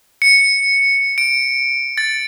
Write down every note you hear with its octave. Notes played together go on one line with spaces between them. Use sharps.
C#7
D7
A6